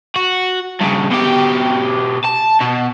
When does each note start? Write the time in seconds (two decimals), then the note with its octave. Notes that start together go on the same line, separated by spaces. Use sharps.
0.16 F#4
0.81 G2 C#3
1.10 B2 G4
2.25 A5
2.61 B2